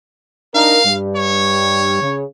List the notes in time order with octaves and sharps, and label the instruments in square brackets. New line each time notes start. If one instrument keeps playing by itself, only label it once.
[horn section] D4 D#4 A#4 [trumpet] F5
[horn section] G2 G3
[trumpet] C#5
[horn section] C#3